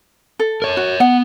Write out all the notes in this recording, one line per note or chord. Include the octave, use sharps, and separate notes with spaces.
A4
A#4 C#5
F#4
B3 F#5